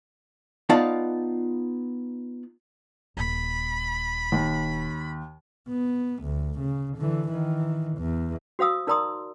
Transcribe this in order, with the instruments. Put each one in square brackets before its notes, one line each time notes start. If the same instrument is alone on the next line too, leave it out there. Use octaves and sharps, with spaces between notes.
[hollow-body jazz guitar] B3 D#4 F4 D5 F5 A5
[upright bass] D#1 [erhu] B5
[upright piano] D#2
[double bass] B3
D2
C#3
D3 E3
D#3 E3
E2
[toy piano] F#4 C5 F5 D#6 E6
D#4 A#4 D5 A#5 C6 D#6